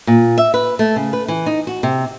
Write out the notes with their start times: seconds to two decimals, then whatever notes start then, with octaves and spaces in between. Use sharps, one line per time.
0.07 A#2
0.38 E5
0.54 B4
0.79 A3
0.96 C#3
1.13 B4
1.28 E3
1.46 D#4
1.67 F#4
1.83 C3